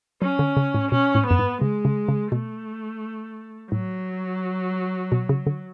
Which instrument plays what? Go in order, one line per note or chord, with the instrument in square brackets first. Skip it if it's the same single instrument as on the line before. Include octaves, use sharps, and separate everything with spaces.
[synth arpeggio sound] F#3 [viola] C#4
[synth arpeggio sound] D3
C#3
A2
[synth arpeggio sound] B2 [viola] C#4
[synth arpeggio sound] A2
[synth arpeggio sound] F#2 [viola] B3
[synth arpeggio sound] G#2
[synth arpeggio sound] C#3 [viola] G#3
[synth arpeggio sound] C#3
C#3
[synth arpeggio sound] B2 [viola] A3
[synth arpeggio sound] A2 [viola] F#3
[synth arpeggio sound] B2
C#3
D3